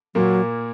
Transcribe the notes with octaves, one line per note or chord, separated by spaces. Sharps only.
A#2 F#3 A#3